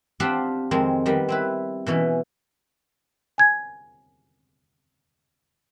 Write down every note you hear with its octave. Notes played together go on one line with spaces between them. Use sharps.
C4 D4 F4 G4 C5 F#5
F2 D#3 G#3 C4
D#3 G3 B3
C4 E4 B4
B2 E3 C#4
G#5 G#6